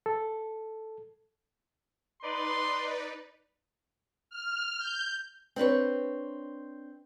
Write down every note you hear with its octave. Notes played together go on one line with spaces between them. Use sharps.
A4
D#4 B4 D5 C6
F6
G6
C4 D4 B4 C#5